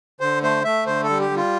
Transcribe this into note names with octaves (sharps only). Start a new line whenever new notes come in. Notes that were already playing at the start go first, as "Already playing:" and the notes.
D3 C5
A3 C5
A3 E5
D3 C5
A4
G3
G4
G3
F4